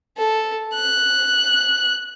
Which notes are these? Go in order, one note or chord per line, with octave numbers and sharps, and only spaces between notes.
A4
F#6